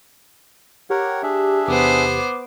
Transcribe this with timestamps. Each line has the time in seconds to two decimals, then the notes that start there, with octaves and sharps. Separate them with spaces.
0.90 G4 A#4 C#5 F#5
1.23 D4 G#4 E5
1.68 E2 C3 B3 G4 C5 D6